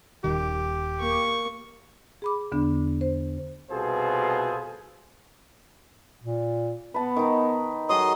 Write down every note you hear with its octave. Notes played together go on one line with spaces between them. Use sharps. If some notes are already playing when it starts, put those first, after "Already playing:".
D#1 D#3 G4
A#3 C#6
G#4 B5 D6
E2 D3 B3 D4
C5
C2 B2 F4 G#4 A4 C5
A#2
B3 B4 A5
D#3 D#4
F#3 G#4 A4 D#5 C6 D#6